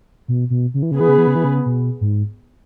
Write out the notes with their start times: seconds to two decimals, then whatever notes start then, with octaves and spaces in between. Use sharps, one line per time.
0.28 B2
0.50 B2
0.74 C#3
0.83 E3
0.91 C#3
0.97 E3 B3 G#4 B4
1.08 C#3
1.18 E3
1.27 C#3
1.35 E3
1.44 C#3
1.66 B2
2.01 G#2